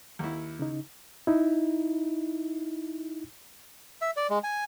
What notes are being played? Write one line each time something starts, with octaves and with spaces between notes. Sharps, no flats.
D#2 E4
C#3 D#4
D#4 E4
E5
D5
G#3
G#5